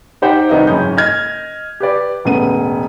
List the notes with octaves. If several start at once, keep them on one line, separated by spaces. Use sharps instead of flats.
D#4 G4 C5 F#5 G5
C2 D#3 D#4 F#4 B4 E5
F#1 G#2 C#4 B5 D#6 G6
D#5 F6 G#6
G4 B4 D5
E1 A2 C#3 B3 D#7